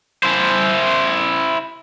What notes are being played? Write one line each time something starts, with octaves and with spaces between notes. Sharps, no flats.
E4 C5